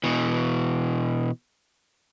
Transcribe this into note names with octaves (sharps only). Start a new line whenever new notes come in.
B2 E3